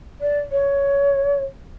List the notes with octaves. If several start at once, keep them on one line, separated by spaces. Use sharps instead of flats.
D5
C#5